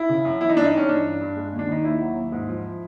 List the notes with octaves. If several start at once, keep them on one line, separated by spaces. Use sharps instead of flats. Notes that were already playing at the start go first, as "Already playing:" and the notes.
Already playing: E4
C#3
F#2
E3 E4
D#4
G2 D4
D#4
G2 C#4
E3 D4
G2
G2
G#3
D#2
D4
D#3 D#4
D#2 E4
F#3
D#2
G#2
F3